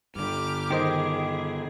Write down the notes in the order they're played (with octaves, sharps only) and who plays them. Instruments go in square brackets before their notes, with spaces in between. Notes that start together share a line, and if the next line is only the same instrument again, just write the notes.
[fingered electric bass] G2 D3 [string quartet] G4 D6 F6
[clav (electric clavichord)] D#3 C5 D#5 [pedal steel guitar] G4 [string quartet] G#4